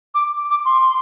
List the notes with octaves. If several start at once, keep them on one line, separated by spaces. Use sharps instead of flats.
D6
D6
C6